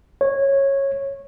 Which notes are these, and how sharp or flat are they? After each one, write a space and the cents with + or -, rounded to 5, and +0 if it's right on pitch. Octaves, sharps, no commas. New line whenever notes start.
C#5 -15